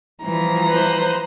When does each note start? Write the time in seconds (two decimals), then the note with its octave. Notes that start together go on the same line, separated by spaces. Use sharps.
0.24 E3 F3 G3 A#5
0.69 B4 C5